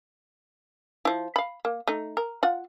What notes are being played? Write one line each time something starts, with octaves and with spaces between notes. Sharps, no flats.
F3 E4
F5 B5
A#3
A3 D#4
A#4
F4 F#5